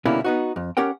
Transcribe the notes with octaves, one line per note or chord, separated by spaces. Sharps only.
B2 D3 G3 A#3 C#4 E4
B3 D#4 F#4
F2
C#4 G4 A#4 F#5 G5